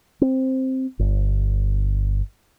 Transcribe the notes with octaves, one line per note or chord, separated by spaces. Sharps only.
C4
G1